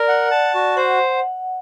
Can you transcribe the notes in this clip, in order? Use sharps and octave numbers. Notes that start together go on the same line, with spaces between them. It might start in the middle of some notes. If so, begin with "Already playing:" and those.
Already playing: A#4 D5
F#5
A5
F#4
C5 F#5